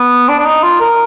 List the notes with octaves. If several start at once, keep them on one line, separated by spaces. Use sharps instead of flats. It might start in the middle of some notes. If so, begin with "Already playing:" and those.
Already playing: B3
D4
D4
D#4
F4
A#4